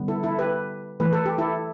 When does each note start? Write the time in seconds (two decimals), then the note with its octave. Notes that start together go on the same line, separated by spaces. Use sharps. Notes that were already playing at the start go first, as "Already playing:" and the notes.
Already playing: D3 G3 B3
0.08 E4 A4
0.23 E4 A4
0.39 G4 B4
1.00 E3 A3 B4
1.13 A4
1.26 G4
1.38 E4 A4